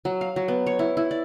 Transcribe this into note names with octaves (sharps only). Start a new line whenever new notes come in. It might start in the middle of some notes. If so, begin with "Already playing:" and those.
F#3
F5
F#3
B3
C#5
E4
E4
D5